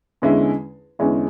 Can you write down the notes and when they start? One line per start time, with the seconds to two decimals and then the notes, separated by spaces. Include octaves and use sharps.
0.22 E2 D3 G#3 C#4 E4
0.99 E2 D3 G#3 C#4 E4